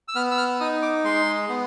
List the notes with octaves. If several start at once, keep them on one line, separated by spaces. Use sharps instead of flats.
E6
B3 F6
E6
F6
D#4 D#6
D6
G#3 C6
B3